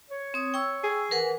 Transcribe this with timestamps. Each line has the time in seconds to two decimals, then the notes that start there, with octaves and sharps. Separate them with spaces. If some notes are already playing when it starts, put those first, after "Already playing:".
0.11 C#5
0.34 C4 D#6
0.54 G5 C#6 E6
0.84 G#4
1.11 E3 A#4 B4 F#5